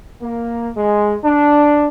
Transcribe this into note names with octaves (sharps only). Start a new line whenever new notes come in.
A#3
G#3
D4